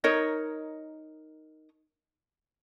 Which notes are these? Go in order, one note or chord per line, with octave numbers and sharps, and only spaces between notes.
D#4 A#4 C#5 D#5